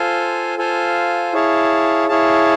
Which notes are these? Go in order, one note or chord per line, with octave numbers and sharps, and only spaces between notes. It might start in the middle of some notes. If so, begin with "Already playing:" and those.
Already playing: F4 A4 C5 F5 G#5
F4 A4 C5 F5 G#5
E4 G#4 C#5 F5 A5
E4 G#4 C#5 F5 A5